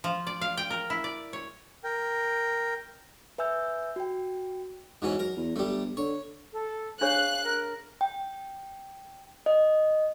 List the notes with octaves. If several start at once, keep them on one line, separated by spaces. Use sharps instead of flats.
F3
D5
F5
G5
A#4
E4
D5
C#5
A#4 G5
B4 E5 G#5 E6 G6
F#4 G5
G#2 B2 E3 C#4
F#3 A#4
E2
G1 G3 A3
D3 C#5
A4
D4 G#4 C#5 F5 F#6
A#4
G5
D#5